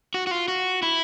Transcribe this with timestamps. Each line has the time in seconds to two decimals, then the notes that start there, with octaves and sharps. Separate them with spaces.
0.14 F#4
0.27 F#4
0.31 F4
0.48 F#4
0.83 E4